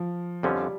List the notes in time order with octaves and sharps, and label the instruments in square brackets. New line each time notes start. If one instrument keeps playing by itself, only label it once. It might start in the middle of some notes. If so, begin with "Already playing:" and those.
Already playing: [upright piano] F3
[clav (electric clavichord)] F2 D3 F3 C#4 [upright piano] G3